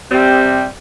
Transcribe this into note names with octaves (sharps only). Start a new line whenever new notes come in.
C3 G3 C4